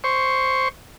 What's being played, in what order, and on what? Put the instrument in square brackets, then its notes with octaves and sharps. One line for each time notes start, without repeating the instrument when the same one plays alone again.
[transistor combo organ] C5 C#6